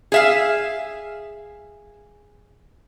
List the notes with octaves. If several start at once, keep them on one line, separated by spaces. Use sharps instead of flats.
G#4 E5 F5